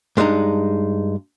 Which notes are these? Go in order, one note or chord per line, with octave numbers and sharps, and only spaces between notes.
G2 G#3 D4 D#4 A#5